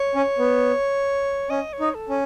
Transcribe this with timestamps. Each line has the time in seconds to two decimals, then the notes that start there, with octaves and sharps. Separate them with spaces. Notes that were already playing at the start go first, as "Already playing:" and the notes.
Already playing: C#5
0.15 C#4
0.38 B3
1.50 C#4 D#5
1.73 C#5
1.80 D#4
1.95 A4
2.09 C#4